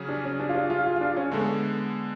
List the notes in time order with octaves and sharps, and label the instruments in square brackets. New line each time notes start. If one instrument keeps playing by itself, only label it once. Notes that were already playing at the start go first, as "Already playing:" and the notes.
Already playing: [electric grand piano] C#3 F#3 C#4 G#4
[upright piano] D4
C#4
D4
F4
D4
F4
F4
F4
D4
C#4
[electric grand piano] D3 G#3 B3 [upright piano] A3